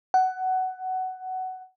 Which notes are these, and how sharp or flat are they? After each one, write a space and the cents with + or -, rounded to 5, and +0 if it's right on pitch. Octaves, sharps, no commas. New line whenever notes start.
F#5 +15